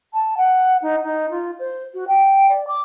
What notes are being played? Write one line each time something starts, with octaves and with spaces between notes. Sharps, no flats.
A5
F#5
D#4
D#4
F4
C5
F#4
G5
D5
D6